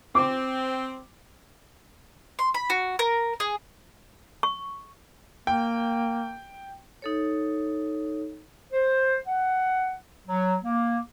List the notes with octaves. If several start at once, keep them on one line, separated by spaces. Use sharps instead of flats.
C4 D6
C6
B5
F#4
A#4
G#4
C#6
A#3 G5
D#4 A4 C#5
C5
F#5
F#3
A#3